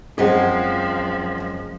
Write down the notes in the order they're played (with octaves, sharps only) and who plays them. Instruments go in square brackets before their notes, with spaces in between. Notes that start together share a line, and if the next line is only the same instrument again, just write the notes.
[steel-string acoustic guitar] F#2 G#3 C4 [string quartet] F3 [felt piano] G#4 F#5